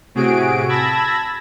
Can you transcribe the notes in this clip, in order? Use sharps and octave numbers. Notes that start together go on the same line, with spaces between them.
A2 C3 F#4 G#4 D7
A5 B5 E6 G#6 A#6